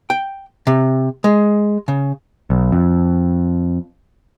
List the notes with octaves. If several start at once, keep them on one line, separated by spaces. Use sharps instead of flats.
G5
C3
G#3
C#3
B1
F2